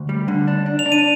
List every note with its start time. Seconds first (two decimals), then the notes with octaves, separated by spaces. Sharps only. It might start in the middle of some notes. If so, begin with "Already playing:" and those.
Already playing: D2
0.09 G3
0.28 D3
0.48 D4
0.66 D4
0.79 F7
0.86 D4
0.92 D#7